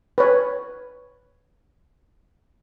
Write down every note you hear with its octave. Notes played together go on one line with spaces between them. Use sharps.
B4 C#5